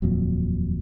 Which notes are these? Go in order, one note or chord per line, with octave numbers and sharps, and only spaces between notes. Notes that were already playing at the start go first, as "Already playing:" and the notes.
D#1 F2 A#2 F#3